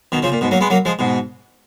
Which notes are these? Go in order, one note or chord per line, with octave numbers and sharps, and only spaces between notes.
B2 D#3
C#3 F3
A#2
G#2 B2
F#3 A#3
G#3 B3
F#3 A#3
F3 G#3
G#2 B2